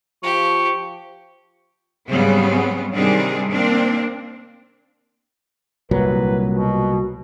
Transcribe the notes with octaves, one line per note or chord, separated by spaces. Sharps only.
F3 G4 C#6
G#2 C#3 F#3 G3 B3 C4
C3 D#3 G3 C4 D4 G#4
A#3 C4 D4
C2 A#2 F#3 B4
B2